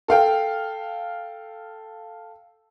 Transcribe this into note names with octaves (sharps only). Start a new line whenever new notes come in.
A4 F5 G5